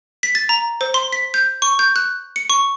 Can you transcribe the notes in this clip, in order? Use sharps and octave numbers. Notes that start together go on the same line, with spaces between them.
B6
A6
A#5
C5
C6
B6
G6
C#6
G6
F#6
C#7
C#6